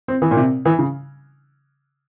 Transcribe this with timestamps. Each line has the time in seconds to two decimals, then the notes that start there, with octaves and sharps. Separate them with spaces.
0.08 C4
0.22 E3
0.31 A#2
0.37 C3
0.65 E3
0.79 C#3